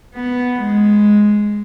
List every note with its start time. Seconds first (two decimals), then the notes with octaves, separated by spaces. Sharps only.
0.15 B3
0.59 G#3